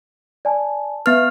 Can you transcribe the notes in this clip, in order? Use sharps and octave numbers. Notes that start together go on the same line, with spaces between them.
D5 G#5 A5
B3 B4 E5 F6